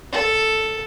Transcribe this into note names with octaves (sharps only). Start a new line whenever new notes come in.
A4